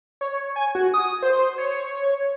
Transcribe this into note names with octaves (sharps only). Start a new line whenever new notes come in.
C#5
G#5
F#4
D#6
C5
C#5